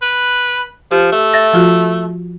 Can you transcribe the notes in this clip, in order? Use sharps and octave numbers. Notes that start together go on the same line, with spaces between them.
B4
F3 G4
A3
E5 A6 A#6
F3 F4 F#4